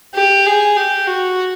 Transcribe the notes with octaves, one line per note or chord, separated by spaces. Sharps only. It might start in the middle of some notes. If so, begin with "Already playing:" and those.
G4
G#4
G4
F#4